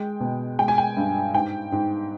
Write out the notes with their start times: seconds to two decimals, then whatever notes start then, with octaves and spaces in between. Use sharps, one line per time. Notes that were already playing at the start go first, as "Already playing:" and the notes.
Already playing: G#3 G5
0.20 B2
0.59 G#3 G5
0.68 G#5
0.78 G5
0.97 G2
1.33 G#2 G5
1.72 G#2